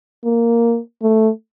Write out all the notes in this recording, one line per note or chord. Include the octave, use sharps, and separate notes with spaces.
A#3
A3